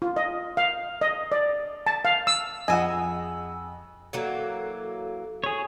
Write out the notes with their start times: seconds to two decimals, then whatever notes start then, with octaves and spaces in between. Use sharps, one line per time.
0.02 F4
0.16 D#5
0.57 F5
1.01 D#5
1.32 D5
1.86 A5
2.05 F5
2.27 E6
2.68 F2 G#4 D#5 F#5 G#5 E6
4.13 E3 F#3 A#3 A4
5.44 G#4 C#5